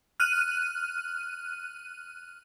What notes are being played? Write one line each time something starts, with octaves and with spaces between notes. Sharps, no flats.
F6 F#6 D#7